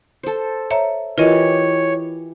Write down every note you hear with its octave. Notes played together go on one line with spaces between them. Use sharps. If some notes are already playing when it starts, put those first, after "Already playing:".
A4 C5
C#5 E5 A#5
E3 F4 G4 A#4 C#5 D#5